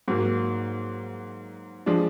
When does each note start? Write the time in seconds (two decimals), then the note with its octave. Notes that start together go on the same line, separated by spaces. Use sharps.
0.08 G#2 F#3 A#3
1.86 F3 G#3 D4